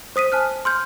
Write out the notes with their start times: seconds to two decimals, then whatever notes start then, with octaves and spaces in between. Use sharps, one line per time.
0.16 C5 D#6 B6 D#7
0.32 G#5 A5 F6 F#6
0.65 C6 F6 G6